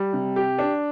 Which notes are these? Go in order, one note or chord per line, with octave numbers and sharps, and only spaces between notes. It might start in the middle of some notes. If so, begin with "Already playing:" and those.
Already playing: G3
C3
G4
D4